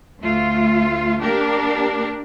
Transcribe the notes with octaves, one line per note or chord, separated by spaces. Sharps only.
D2 A3 F4
A#3 D4 G4 A#4